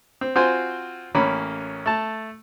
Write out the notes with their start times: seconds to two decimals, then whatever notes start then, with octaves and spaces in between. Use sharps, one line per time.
0.21 C4
0.36 C4 F4 F#4 C5 G#5 C6
1.15 A1 A#3 C#4 B5
1.86 A3 A5